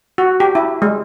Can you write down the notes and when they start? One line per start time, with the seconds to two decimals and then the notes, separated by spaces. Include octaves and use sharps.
0.18 F#4
0.40 G4
0.55 E4
0.82 G#3